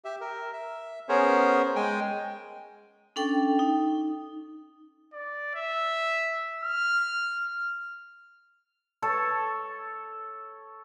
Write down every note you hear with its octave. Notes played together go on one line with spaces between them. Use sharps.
G4 E5
A#4
E5
B3 C#4 G#4 A#4 C5 C#5
G#3 G5 G#5
C#4 D4 A4 G5
D#4
D5
E5
F6
A4 C#5 A5